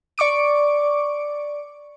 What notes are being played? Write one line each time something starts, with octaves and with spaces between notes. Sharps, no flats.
D5 C#6 D6 D7